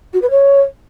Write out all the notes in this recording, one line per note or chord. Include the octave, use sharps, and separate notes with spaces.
F#4
B4
C#5